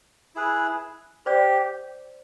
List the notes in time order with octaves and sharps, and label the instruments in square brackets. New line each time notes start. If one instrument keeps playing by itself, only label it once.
[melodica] E4 G#4 B4
[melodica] G4 [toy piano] C5 D5